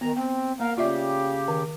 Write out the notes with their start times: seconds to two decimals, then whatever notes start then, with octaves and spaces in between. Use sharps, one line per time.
0.01 D#3 B3 A#5
0.17 C4 G5
0.60 A#3 A#4 F5
0.78 C#3 F4 G4 D5 E5
1.48 D#3